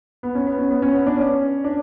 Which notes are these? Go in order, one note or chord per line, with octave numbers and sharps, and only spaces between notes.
B3
C#4
B3
C#4
B3
C#4
B3
D4
C#4
D4